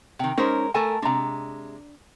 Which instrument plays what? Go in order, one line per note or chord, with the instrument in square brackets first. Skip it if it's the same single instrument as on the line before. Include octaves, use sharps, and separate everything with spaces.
[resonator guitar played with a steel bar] C3 D#3 [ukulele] G5
[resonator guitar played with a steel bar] G#3 A#4 [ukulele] C#4 D#4 C5
[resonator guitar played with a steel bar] A3 A#4 [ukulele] A4 G#5 A5
[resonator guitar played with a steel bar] C3 G#3 [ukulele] D4 A#5